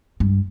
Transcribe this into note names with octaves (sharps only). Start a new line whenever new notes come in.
G2